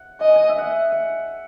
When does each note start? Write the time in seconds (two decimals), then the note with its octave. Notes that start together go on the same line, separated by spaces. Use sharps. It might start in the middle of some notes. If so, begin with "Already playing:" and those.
Already playing: F#5
0.20 D#5 G#5
0.36 G#5
0.49 E5
0.58 F#5
0.92 F#5